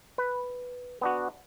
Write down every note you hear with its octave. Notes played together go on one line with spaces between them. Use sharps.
B4
B3 D4 F#4